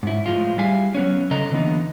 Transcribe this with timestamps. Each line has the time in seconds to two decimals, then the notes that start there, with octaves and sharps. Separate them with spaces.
0.03 G#2 E4
0.26 A2 F3 G#3 F4
0.58 G3 E4 G#4 F5 G#5
0.95 F#3 B3 C#4
1.31 C#3 C#4 A4 D#5 A#5
1.51 D3 E3 A#3 B3 D#4